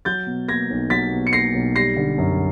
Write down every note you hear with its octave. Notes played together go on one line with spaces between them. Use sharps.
F#3 G6 A6
B2
A#3 G#6 A#6
B1
F#3 A6 B6
B2
C#7
A#3 A#6 C7
B1
G3 A#6 C7
D3
F#2